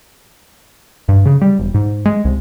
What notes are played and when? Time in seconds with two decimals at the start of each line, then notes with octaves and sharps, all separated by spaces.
1.09 G2
1.26 C#3
1.41 G3
1.59 E1
1.74 G#2
2.05 G#3
2.25 C2